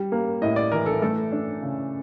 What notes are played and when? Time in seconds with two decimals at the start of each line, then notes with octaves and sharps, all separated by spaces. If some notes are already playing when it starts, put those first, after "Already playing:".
Already playing: G3
0.12 A#3
0.42 A2 D#5
0.56 D5
0.72 E3 A#4
0.86 A4
1.02 A3 A4
1.32 D4
1.62 C#3